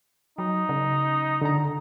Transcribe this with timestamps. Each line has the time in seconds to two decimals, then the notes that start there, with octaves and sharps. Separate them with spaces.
0.38 F#3 D#4
0.69 C#3
1.41 D3 A#5